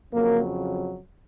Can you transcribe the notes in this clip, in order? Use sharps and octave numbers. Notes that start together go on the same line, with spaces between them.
F2 C#3 F#3 A#3 A#4